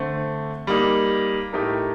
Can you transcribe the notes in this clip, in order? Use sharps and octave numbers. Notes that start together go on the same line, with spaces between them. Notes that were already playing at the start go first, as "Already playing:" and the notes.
Already playing: D3 A3 C4
G3 A#3 D#4
A2 A3 D#4 G4 A#4